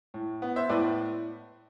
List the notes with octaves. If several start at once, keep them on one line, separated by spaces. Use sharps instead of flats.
A2
B3
C5 E5
A2 B4 D5